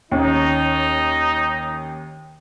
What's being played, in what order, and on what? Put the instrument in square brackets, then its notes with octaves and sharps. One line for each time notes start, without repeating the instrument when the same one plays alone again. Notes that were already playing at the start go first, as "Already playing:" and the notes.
[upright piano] D#2 C#4 [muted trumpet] D#4